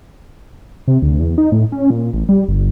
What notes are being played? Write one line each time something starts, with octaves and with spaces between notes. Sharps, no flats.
C3
D2
E2
D#4
A2
C#4
A#2
A1
G3
G1